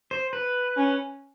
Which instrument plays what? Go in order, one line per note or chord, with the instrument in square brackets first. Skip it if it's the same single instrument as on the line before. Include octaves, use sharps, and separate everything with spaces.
[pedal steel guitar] C5
B4
[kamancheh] C#4